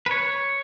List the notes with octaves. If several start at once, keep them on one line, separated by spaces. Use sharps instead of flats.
B4
C#5